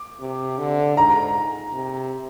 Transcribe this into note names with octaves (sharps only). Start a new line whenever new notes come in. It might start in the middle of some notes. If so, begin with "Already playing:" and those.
Already playing: D6
C3
D3
G#2 A#5
C3